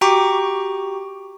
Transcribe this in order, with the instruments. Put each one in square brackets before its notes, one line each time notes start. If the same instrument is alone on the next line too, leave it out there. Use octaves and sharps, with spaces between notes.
[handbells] F#4 G4 G5 A#5 C#6 D6